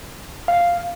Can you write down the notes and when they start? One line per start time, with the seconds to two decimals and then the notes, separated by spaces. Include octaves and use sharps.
0.48 F5